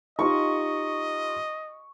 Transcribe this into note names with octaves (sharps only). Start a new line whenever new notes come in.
D#4 F4 G4 D#5 C#6